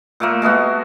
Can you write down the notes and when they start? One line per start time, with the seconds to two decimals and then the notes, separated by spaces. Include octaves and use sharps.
0.20 A#2 A3 A#3
0.42 G#3 A3 B3 F#4